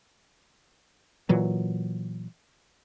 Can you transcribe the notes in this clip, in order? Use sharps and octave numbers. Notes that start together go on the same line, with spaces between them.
A#2 E3 F#3